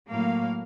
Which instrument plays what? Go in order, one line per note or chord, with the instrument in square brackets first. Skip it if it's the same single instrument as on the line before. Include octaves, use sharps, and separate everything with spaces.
[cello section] A2 F#3 A#3 F5